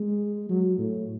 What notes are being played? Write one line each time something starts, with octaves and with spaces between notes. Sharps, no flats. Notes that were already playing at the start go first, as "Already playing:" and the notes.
Already playing: G#3
F#3
A2